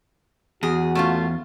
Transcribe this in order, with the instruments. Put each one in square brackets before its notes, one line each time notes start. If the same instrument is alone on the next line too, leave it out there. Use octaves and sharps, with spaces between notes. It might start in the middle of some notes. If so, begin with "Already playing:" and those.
[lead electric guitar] E2 [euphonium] F#4 [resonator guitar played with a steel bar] G#4
[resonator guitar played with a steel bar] A3 C#4 F4